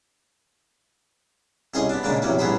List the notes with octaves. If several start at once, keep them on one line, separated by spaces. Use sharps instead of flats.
C2 C#4 G#4 D#5 G#5 C6
B3 D4
A#2 C#3 G#3 A#3 D4
A#1 E2 C3 F#3 A#3 C#4
A1 G2 B3 G#4 C5 B5